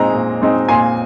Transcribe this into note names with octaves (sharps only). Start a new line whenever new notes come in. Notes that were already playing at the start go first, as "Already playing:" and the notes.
Already playing: A#2 G#3 C4 D#4 A#5
A#2
G#3 C4 D#4
A#2 G#5 C6